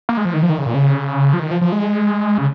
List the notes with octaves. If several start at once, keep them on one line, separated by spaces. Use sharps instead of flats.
A#3
G#3
F3
D#3
F3
D#3
C#3
A#2
C#3
F3
D#3
F3
F3
G#3
C#3